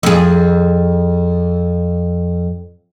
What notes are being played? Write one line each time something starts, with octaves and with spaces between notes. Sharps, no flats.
F2 G#4